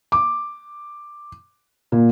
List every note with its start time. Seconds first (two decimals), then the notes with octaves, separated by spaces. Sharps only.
0.12 D6
1.92 A#2